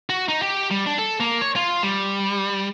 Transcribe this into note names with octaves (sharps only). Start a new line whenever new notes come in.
F#4
D#4
G4
G3
D4
A4
A#3
C#5
F4
G3